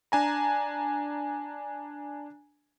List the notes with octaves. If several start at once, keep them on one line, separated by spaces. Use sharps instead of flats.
D4 G#5 A#5